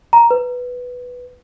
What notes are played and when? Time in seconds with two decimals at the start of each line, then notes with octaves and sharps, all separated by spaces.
0.13 A#5
0.31 B4